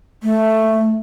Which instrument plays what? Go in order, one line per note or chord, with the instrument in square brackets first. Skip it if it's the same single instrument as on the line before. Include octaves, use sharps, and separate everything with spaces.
[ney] A3